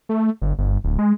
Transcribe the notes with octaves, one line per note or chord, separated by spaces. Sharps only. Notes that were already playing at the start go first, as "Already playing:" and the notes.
A3
G1
G1
D1
G#3